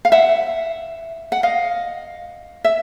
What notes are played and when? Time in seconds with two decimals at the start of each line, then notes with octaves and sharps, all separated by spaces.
0.05 F5
0.12 E5 F#5
1.32 F#5
1.43 D#5 F5
2.64 E5